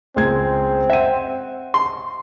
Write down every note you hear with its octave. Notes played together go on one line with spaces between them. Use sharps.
C#2 G#3 C4 G#6
E5 F#5 D#7
C6